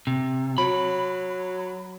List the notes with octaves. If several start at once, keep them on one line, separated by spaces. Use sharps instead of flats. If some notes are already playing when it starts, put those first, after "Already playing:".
C3
F#3 B5